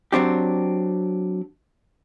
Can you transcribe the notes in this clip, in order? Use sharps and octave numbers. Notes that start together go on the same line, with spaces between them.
F#3 C4 D4 G4